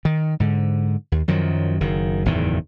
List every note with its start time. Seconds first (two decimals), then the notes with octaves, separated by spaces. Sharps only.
0.05 D#3
0.40 G#2 D3
1.12 D#2
1.28 F#2 D#3 F3 F#3
1.81 F#1 D#3
2.26 F#1 E2 A2 D#3